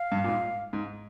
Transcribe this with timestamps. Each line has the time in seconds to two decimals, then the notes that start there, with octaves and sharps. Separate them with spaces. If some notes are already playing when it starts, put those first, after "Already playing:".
Already playing: F5
0.12 G2
0.24 A#2
0.28 G#2
0.73 G#2